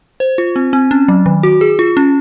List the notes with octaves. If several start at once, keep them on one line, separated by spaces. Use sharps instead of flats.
C5
F4
C4
C4
C#4
F#3
D#3
F#4
G#4
F4
C#4